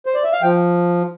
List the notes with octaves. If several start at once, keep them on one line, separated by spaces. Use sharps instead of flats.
C5
D5
E5
F5
F3 G5